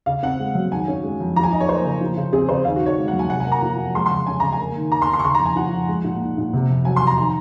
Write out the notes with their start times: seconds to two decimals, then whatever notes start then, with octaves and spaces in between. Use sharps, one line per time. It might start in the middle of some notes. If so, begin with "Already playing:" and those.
0.06 C#3 F5
0.23 C4 F#5
0.40 G#3
0.55 F#2
0.71 D#3 G#5
0.88 C#4
1.03 G#3
1.20 F2
1.36 F3 A#5
1.44 G#5
1.52 D#4 D#5
1.61 C#5
1.68 A#3 C5
1.85 C#3
2.01 F3
2.17 C#3
2.33 C4 G#4
2.49 C#3 C5
2.65 D#3 F5
2.76 F#4
2.81 D#4 C#5
2.98 G#3
3.08 F#5
3.13 F#2
3.19 G#5
3.30 C3 F#5
3.40 G#5
3.47 A#3 A#5
3.62 F3
3.79 F2
3.94 G#3 C6
4.06 C#3 C6
4.27 C#4 G#5
4.40 C#3 A#5
4.53 G#5
4.59 A#3
4.76 D#3
4.92 D#4 A#5
5.02 C6
5.08 D#3
5.13 C6
5.19 C#6
5.24 C#3 C6
5.35 A#5
5.40 F2
5.46 G#5
5.56 F3 F#5
5.73 F2
5.88 G#3
6.04 A#2
6.21 D#4
6.38 A#2
6.54 C3
6.69 F2
6.85 F#3 G#5
6.96 C6
7.02 F2
7.07 A#5
7.17 D#3 A#5